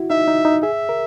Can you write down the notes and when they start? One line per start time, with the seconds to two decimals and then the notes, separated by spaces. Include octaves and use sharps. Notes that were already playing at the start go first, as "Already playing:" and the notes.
Already playing: E4 F#4
0.10 D#4 E5
0.28 D#4
0.45 D#4
0.63 G#4 E5
0.89 A#4